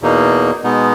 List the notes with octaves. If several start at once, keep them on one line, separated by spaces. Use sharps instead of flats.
E2 B2 A#3 D#4
B2 G#3 B3 D#4